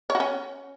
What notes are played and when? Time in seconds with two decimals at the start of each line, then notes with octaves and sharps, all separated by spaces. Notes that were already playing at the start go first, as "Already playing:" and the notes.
0.10 C#5
0.15 F#4
0.20 C#4